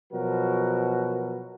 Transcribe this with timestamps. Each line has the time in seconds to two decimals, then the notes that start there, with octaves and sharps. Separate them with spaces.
0.12 B2 F3 F#3 F#4 A#4